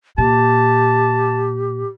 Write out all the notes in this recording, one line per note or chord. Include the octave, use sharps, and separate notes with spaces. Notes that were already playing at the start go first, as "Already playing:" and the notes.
A#2 G4 A5